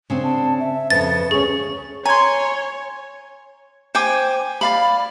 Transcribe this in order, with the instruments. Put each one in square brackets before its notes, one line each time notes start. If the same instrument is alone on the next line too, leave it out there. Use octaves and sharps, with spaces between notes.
[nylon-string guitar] C#3 C4 D4
[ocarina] A5
E5
[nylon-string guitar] F2 C#3 [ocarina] B4 [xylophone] A6
[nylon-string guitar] D2 C#4 [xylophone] G#4 [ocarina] C#6
[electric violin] C#5 [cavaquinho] G#5 C6 [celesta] A#5 G#6
[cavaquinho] C5 G5 G#5 D6
D5 F5 B5